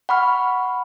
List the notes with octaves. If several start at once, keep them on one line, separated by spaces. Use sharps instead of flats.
F#5 B5 C#6 F6